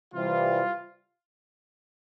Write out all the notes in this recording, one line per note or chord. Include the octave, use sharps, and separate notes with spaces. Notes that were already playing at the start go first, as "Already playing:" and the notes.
C3 E3 G3 F4